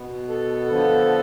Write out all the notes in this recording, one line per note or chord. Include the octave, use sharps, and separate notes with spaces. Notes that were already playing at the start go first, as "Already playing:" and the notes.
Already playing: B2 B3
A4
D3 F3 B3